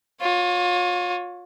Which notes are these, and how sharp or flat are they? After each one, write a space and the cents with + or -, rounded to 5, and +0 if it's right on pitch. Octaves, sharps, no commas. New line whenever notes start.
F4 +35 C#5 +10